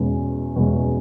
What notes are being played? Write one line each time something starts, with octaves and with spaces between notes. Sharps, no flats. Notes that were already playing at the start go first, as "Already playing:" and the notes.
Already playing: E2 B2 G#3 C#4
E2 B2 G#3 C#4